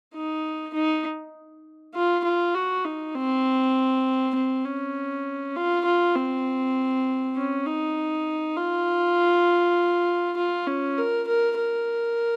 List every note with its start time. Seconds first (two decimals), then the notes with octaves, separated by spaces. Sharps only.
0.14 D#4
0.74 D#4
1.95 F4
2.24 F4
2.55 F#4
2.85 D#4
3.15 C4
4.35 C4
4.65 C#4
5.56 F4
5.85 F4
6.15 C4
7.36 C#4
7.66 D#4
8.56 F4
10.37 F4
10.67 C#4
10.97 A#4
11.27 A#4
11.57 A#4